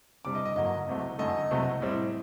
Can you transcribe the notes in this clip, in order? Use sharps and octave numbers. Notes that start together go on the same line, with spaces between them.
C3 G3 D4 D6
D#5
D#5
G2 D3 F#3 A#3 D#5
C2 C3 F#3 A3
F#2 D3 A3 D#5
C2 C3 F#3 A3
A2 G3 C4